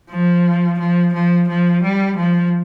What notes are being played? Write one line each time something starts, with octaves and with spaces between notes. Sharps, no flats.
F3
F3
F3
F3
G3
F3